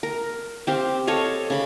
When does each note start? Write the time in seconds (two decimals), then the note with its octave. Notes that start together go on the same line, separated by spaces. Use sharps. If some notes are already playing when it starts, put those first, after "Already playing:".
0.03 A#4
0.67 C4 G4 F5
1.07 A4 C#5 D#5 F5
1.50 C#3 B5